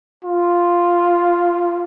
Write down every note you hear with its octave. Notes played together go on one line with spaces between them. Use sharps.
F4